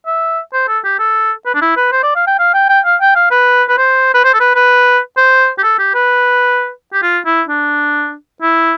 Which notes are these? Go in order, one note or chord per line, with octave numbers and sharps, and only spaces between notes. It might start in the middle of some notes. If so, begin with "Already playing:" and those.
E5
C5
A4
G4
A4
B4
D4
E4
B4
C5
D5
F5
G5
F5
G5
G5
F5
G5
F5
B4
B4
C5
B4
C5
A4
B4
B4
C5
G4
A4
G4
B4
G4
F4
E4
D4
E4